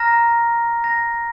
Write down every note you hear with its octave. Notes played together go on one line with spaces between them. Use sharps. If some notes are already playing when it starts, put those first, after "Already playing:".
Already playing: A#5 F6 A#6
A#6